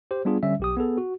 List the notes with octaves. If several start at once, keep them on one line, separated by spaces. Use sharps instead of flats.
G4 C5
G3 B3 D4 F4 G#4
D3 G3 C#4 E5
B1 G4 D#6
B3 G#4 A4
F#4